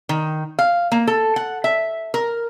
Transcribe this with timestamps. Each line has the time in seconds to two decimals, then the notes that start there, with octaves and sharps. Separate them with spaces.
0.09 D#3
0.59 F5
0.92 A#3
1.07 A4
1.36 F#5
1.64 E5
2.14 A#4